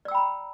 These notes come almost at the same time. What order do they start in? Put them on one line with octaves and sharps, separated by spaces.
D5 E6 G5 B5 A#5